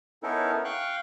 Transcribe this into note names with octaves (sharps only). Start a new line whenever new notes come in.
B3 C#4 D#4 E4 A4 A#4
F5 G5 C#6 F#6